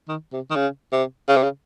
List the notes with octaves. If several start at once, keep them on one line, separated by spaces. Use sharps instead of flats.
D#3
C3
D#3
C#3
C3
C#3
C3
C#3